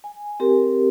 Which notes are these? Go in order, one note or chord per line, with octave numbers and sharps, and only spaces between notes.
G#5
C4 G4 A#4